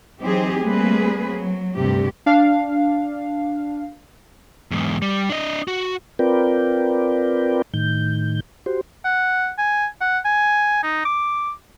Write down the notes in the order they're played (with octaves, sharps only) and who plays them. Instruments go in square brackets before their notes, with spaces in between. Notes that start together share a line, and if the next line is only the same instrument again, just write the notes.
[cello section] E3 F#3 C4 D#4 G4 G#4
G3 A3 A#3 C4 G#4 B4
F#3
D2 G2 C3 G4
[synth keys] D4 F5
[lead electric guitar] E2 G#2
G3
D4 D#5
F#4
[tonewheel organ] C4 F4 A#4 B4 D5 G5
A2 D#3 G6
F#4 G4 C5
[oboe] F#5
G#5
F#5
G#5
D#4
D6